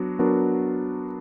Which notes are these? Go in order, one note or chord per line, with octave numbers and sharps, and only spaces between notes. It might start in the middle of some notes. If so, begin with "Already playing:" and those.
Already playing: F#3 B3 D4 F#4
F#3 B3 D4 F#4 A#4